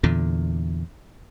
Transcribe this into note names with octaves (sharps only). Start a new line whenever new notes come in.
E2 A#2 D3